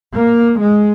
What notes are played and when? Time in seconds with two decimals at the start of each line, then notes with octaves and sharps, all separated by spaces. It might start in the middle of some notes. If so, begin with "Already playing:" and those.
0.15 A#3
0.61 G#3